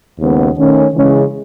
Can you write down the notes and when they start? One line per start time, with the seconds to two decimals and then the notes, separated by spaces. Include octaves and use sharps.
0.19 D#2 C#3 G#3 B3
0.57 D#3 A3 C#4
0.93 C#3 E3 G#3 C#4